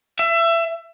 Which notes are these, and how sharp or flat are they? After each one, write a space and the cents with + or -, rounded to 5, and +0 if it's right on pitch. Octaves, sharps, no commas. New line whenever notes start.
E5 +25